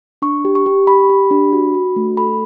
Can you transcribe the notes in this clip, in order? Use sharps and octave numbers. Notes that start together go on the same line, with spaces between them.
D4 C#6
G4
C#6
G4
G4 B5
G4
D4
F#4
F#4
A3
A4 B5